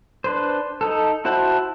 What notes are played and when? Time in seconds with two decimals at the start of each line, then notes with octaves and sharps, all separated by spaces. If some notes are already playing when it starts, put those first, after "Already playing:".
0.24 D4 B4 C5
0.81 D#4 A4
1.25 E4 F#4 C5 A5 B5